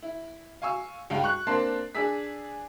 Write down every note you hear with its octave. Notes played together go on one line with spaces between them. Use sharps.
E4
F5 G#5 C#6 E6
C#2 G2 F5 G5
C#6 F#6
A#3 C4 D4 A5 C6 C7
D4 G#4 E6 B6